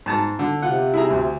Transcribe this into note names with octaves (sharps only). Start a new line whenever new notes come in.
G#2 A5 A#5
D3
C3 F4 F#5
E4 G#4 A#5
D2